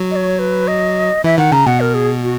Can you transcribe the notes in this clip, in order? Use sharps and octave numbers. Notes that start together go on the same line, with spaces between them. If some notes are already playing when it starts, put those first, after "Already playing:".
Already playing: F#3
D#5
C#5
B4
D#5
E3 E5
D#3 F#5
C#3 A#5
B2 F#5
A#4
G#4
F#4